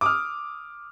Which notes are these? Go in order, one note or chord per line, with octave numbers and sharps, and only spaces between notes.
D6 D#6 F6